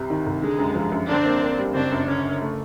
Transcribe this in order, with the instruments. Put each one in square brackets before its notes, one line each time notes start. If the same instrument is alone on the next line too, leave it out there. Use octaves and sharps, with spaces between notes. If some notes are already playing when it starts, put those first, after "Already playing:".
Already playing: [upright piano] C2 C3
D#3
C2
[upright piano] D3 [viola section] G#3
[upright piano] F#2
F3
F#2
[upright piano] D3 [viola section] C4 D4
[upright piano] A#3
A#3
G3
[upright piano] F#1 [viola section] C4 D4
[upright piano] F#2
[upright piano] D3 [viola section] C#4
[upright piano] F#1
A3